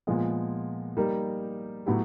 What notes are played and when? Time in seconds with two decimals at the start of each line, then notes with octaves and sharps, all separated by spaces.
0.07 A#2 F3 G#3 B3
0.97 G3 A#3 D#4 G4 A#4
1.86 A2 F#3 B3 E4 G4